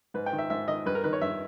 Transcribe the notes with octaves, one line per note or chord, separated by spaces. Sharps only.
G#2 B4
G5
D#3
E5
G#2 E5
D#3 D#5
G2 B4
A#4
D#3 B4
C#5
G2 E5